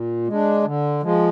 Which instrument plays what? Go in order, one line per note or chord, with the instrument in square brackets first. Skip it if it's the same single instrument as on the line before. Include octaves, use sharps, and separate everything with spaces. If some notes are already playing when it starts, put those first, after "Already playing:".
Already playing: [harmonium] A#2
G#3
D4
D3
F3 G#3